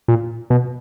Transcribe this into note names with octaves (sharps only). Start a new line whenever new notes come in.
A#2
B2